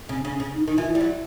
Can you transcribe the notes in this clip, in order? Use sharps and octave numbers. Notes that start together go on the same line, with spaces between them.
C#3 C4
C#3 D4
C#4
C#3
D#4
D#3 D#4
E3 F4
E4
G3
F#3